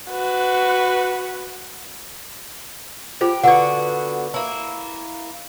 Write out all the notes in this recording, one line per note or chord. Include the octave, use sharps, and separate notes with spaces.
F#4 B4
F4 G4 G#4 C5
D3 B3 F#4 D5 F#5
A#3 E4